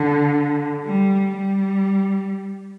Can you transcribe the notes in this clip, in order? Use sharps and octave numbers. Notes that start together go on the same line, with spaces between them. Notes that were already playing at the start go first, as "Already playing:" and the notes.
Already playing: D3
G3
G3